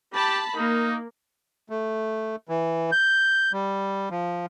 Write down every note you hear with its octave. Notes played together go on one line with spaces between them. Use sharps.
G4 A5 B5
A#3 D#4
A3
E3
G6
G3
F3